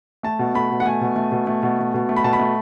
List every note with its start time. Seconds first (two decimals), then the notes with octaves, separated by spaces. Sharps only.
0.23 A3 A5
0.39 B2
0.55 A3 B5
0.71 B2
0.80 F#5
0.85 A3 G#5
1.01 B2
1.16 A3
1.32 B2
1.47 A3
1.63 B2
1.79 A3
1.94 B2
2.09 A3
2.16 B5
2.24 B2 A5
2.33 B5
2.39 A3